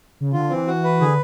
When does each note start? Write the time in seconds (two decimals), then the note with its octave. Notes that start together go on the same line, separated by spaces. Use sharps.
0.21 C#3
0.33 D3 F4
0.50 E3 C4
0.67 F#4
0.84 B4
1.00 D3 G#4